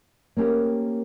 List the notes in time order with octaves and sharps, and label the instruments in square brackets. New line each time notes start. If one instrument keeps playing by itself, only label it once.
[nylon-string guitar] A#3 C4 C#4 G4 A#4